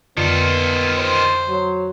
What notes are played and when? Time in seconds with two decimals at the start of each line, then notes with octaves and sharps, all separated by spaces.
0.17 F2 D3 D#3 B3 F4
0.98 C5
1.49 F#3